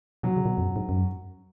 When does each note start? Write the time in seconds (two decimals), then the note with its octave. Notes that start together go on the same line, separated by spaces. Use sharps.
0.23 B2 F#3
0.37 C#3
0.45 A#2
0.49 B2
0.57 F2
0.63 F#2
0.76 G#2
0.89 F#2